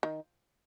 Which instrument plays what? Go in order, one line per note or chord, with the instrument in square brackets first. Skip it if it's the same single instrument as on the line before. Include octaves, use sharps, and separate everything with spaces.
[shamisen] D#3